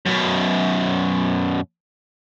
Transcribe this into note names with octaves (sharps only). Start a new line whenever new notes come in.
F#2 B2